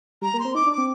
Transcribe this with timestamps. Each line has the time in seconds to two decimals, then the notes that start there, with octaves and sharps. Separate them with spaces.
0.22 G3 A#5
0.34 A#3
0.39 C6
0.45 C4
0.55 D#4 D6
0.66 D4
0.72 D6
0.78 C4